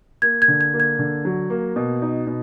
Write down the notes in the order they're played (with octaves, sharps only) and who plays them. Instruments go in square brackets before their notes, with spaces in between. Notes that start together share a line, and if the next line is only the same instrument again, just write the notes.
[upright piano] A#3 [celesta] G#6
[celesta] G#6
[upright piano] D3
[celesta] G#6
[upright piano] A#3
[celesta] G#6
[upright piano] D3
F#3
A#3
B2
D#4
B2